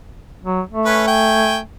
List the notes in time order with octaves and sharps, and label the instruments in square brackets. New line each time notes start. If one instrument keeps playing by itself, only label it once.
[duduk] F#3
A3
[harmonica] C#4 B4
G5 G#5